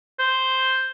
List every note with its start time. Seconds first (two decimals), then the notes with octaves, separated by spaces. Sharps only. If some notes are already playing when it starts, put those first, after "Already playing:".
0.19 C5